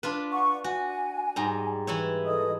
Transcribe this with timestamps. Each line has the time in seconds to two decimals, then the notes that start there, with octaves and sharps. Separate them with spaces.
0.03 D4 F4 B4
0.32 F#5 C#6
0.64 F#4 G#5
1.36 G#2 G3 A#5
1.87 E3 E4 C#5
2.25 A4 D#5 D#6